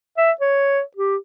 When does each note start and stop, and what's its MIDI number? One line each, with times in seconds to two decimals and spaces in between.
0.17 0.32 76
0.41 0.82 73
0.97 1.16 67